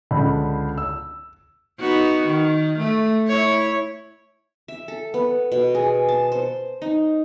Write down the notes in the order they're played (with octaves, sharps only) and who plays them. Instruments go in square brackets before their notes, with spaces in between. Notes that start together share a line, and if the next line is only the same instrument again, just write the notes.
[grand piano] C#2 D3 B5
E6
[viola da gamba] B3 D#4 F#4
D#3
A3
E4 C#5
[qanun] E5
A4
B3
B2
G#4
A5
C5
D#4